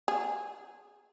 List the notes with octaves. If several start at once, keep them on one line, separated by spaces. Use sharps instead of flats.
G#4